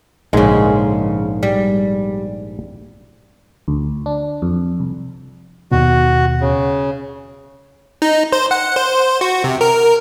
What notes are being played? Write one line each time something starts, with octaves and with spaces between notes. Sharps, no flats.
A#1 G#2 C#3 G#3
G3
D2
D4
F2
C2
D#2 B2 F#4
C#3
D#4
C5
F#5
C5
F#4
C3
A#4